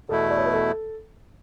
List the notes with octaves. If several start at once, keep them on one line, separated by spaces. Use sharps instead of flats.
E2 B2 A3 E4 A4
D5
C#5
B4
A4